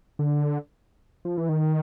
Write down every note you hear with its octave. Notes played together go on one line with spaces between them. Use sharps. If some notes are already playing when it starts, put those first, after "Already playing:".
D3
F3
E3
D#3